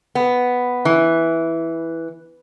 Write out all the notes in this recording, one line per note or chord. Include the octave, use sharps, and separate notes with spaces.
B3
E3